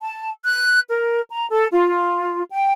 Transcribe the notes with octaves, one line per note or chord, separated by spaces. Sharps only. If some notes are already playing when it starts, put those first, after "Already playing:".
A5
F#6
A#4
A#5
A4
F4
G5